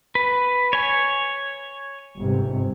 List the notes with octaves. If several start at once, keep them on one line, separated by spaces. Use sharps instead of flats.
B4
C#5 G#5
G1 G#2 C3